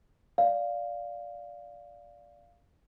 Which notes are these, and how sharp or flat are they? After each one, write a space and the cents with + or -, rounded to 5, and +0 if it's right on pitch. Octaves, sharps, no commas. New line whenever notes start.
D5 -10 F5 +0